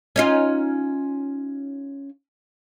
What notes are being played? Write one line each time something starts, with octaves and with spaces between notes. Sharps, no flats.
C#4 D#4 F4